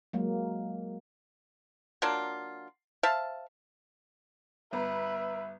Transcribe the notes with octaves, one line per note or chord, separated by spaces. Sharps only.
F#3 G#3 A#3
F#3 A#3 D4 F4
C5 E5 F5 A5
G1 B3 B4 E5 A#5